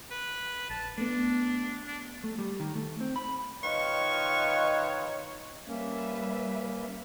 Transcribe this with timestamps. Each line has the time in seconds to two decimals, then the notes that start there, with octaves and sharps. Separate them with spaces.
0.11 B4
0.70 A#1 A5
0.98 A3 B3 D4
1.87 D4
2.24 A3
2.39 G3
2.60 D#3
2.75 A3
3.01 C4
3.16 B5
3.63 D#3 F4 B4 C#5 D#5 C#6
5.67 G3 A#3 C#4 B4 E5